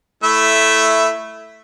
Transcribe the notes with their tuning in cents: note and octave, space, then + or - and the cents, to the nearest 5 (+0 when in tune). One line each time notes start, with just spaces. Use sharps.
A3 +0 E4 +5 E5 +0